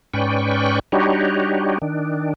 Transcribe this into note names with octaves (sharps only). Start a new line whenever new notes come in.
G#2 C#4 B4 D5 G5 C#6
G3 D4 D#4 F#4 G4 C#5
D#3 D4